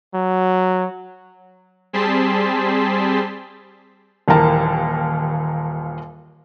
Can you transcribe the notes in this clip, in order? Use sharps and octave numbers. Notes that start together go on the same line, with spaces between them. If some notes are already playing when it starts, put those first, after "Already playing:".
F#3
G3 C4 G#4 A5 C6 B6
D#1 D#2 E3 A#4 A5